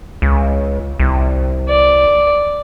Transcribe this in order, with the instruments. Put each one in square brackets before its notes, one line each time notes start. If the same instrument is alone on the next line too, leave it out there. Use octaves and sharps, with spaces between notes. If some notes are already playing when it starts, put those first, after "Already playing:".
[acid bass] C#2
C2
[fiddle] D5